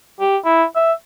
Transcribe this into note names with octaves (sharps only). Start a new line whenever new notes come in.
G4
E4
E5